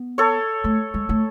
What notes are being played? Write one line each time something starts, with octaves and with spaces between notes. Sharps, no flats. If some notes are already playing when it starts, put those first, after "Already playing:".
Already playing: B3
A4 C#5
A3
G#3
A3